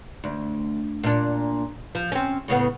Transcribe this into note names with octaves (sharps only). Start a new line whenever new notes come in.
D2
A#2 D4
F3
C4 C#4
A2 C#3 B3